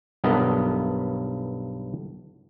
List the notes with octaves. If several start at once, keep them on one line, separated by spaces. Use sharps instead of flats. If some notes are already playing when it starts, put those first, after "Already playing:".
B1 G2 B3 A#4 D#5 A5